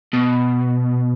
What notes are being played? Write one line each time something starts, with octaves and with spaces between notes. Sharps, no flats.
B2